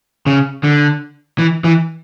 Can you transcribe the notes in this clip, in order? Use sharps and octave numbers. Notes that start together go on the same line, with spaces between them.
C#3
D3
E3
E3